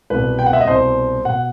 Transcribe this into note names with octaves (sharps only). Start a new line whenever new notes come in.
C2 B2 B4
G5
F#5
E5
D#5
C2 B2 C5
B2 F#5